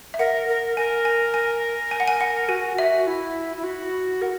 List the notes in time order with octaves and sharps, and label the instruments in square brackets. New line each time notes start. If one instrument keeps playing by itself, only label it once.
[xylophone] E5
[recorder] A#4 [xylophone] F#5
[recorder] A#4
[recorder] A#4 [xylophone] G#5
[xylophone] G#5
G#5
G#5
F#5
G#5
F#5
[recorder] F#4 [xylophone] G#5
[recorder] F#4 [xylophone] E5
[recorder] E4
E4
F#4
[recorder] A#4 [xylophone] F#5